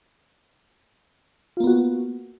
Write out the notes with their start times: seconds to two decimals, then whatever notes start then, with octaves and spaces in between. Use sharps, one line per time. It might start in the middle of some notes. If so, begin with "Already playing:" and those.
1.57 F4
1.60 A#3
1.64 B3
1.67 F#4